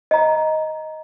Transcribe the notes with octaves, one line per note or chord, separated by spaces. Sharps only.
D#5 A#5